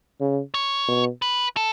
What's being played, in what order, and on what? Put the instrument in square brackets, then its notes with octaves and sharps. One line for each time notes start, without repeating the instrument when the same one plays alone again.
[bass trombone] C#3
[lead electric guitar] C#5
[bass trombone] B2
[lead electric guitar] B4
A4